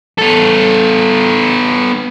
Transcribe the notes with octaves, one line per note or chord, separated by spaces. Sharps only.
B3 A4